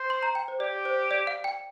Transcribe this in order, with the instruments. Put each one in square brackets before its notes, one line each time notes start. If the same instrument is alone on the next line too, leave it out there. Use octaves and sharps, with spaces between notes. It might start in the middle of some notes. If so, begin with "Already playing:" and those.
Already playing: [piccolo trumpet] C5
[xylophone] C6
A#5
G5
C5
[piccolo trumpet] G4 [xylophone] D5
[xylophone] C5
D5
F5
G5